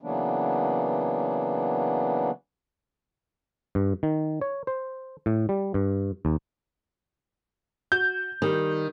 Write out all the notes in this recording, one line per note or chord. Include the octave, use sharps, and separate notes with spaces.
C#3 E3 F#3 A#3 B3 D4
G2
D#3
C#5
C5
A2
G3
G2
D#2
F#4 G6
D#3 G3